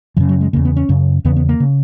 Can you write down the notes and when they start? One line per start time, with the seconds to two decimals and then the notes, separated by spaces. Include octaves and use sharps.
0.17 F#2 C#3 E3
0.29 F#3
0.41 G#3
0.53 C#3 A#3
0.56 E2
0.65 B3
0.76 C#4
0.89 F#2 C#3
1.25 E2 C#3 B3
1.36 B3
1.49 A#3
1.60 C#3